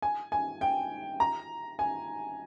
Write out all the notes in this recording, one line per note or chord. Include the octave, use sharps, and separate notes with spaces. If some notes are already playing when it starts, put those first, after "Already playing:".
G#5
G#5
G5
A#5
G#5